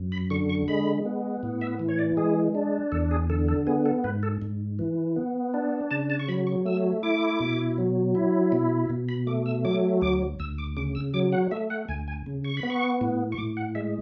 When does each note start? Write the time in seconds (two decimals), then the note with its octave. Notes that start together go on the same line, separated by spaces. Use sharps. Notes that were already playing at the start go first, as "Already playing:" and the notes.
Already playing: F#2
0.12 B5
0.30 D3 C#6
0.49 C#6
0.68 G#3 B5
1.05 B3
1.43 A2
1.61 E5
1.79 E3
1.89 C#5
1.99 D5
2.17 G#3 G#4
2.55 D4
2.92 E2 A4
3.11 G#4
3.30 D3 A4
3.48 A4
3.67 B3 G#4
3.86 A4
4.04 G#2 B4
4.23 A4
4.42 G#2
4.79 E3
5.16 B3
5.54 D4
5.91 C#3 A5
6.10 A5
6.20 C#6
6.28 F#3 B5
6.47 C#6
6.65 A3 E6
7.03 E4 D6
7.40 B2
7.78 F#3
8.15 E4
8.52 B2
8.90 B2
9.09 B5
9.27 A3 D6
9.46 E6
9.65 F#3 D6
10.02 D2 D6
10.39 D2 E6
10.58 D6
10.77 C#3 D6
10.95 E6
11.14 F#3 D6
11.33 F#5
11.51 A3 E5
11.70 F#5
11.88 D2 G#5
12.08 G#5
12.26 C#3
12.44 C#6
12.57 B5
12.63 B3
12.70 C#6
13.01 A2
13.32 C#6
13.38 A2 D6
13.57 F#5
13.75 G#3 E5